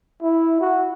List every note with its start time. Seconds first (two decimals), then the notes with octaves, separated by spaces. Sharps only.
0.22 E4
0.61 F#4